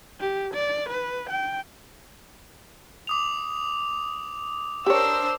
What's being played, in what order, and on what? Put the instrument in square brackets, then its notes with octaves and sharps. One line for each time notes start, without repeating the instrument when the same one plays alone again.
[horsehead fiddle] G4
D5
B4
G5
[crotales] D6 D#6 F7
[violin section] D4 A#4 C5 [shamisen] G4 C#5 [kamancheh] E6